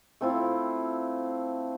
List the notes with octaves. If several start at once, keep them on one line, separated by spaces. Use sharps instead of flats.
A3 C4 E4 F4